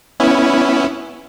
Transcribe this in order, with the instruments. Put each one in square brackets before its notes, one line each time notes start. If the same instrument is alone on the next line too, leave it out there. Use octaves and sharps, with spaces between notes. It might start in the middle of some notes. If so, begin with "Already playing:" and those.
[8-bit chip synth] B3 C#4 E4